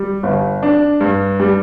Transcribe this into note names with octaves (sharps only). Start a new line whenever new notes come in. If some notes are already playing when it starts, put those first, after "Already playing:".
Already playing: G3
G1
D4
G2
G3